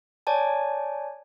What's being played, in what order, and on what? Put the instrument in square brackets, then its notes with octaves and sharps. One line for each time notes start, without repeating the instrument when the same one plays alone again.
[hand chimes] C#5 D5 G#5 A5